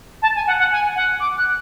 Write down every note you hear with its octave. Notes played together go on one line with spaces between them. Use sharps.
A5
G#5
F#5
F#5
G#5
F#5
D6
F#6